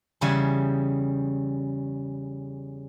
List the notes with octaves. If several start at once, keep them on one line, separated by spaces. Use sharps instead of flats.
E2 C#3 G3 E5 F#5 G#5